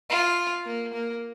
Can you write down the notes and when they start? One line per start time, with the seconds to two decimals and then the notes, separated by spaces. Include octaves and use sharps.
0.10 F4
0.66 A#3
0.93 A#3